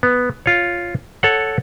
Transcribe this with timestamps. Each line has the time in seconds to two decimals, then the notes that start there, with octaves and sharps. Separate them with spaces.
0.03 B3
0.46 F4 C#5
1.23 A4 C#5 F#5